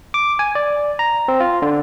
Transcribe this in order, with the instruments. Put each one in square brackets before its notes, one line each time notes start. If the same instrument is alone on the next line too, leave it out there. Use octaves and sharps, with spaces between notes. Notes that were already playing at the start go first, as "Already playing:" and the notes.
[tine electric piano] D6
G#5
D5
A#5
C4
F4
D3